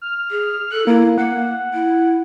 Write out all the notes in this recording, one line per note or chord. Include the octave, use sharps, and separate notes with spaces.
F6
G#4
A4 F#6
A#3 E4
A#3 F#5
E4